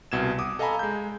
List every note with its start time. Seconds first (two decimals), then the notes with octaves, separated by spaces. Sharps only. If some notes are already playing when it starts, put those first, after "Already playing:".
0.12 C2 B2 G#6 E7
0.39 D6 D#6
0.59 A4 D#5 F5 G#5 A#5 B5
0.79 G#3 G6